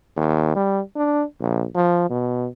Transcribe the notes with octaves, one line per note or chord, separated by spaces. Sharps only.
D#2
G3
D4
A#1
F3
B2